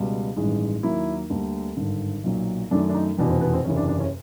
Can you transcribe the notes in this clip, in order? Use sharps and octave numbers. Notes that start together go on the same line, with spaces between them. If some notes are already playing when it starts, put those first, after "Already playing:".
Already playing: C#2 B2 G3
A1 G2 D#3 G#3
D#2 D#3 F#3 A#3 E4
D2 D3 G3 A#3
G#1 G2 D3
B1 A#2 F#3
F#2 D#3 F#3 A3 D4
D4
D#4
F1 E2 B2 D4
C4
B3
C4
F#1 E2 C3 C#4
D4
D4
C#4